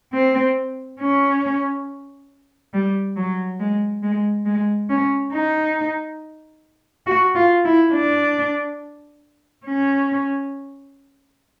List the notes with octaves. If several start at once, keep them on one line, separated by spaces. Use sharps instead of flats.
C4
C#4
G3
F#3
G#3
G#3
G#3
C#4
D#4
F#4
F4
E4
D4
C#4